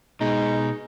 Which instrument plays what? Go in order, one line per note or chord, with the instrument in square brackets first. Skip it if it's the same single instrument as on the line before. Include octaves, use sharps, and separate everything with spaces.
[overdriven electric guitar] B2 [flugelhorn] G#3 [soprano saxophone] D#4